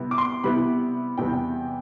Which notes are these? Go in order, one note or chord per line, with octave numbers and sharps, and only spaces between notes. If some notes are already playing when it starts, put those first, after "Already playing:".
Already playing: C3 G3 B3 E4
D6
C6
C3 G3 B3 E4 B5
E2 C3 G3 B3 G5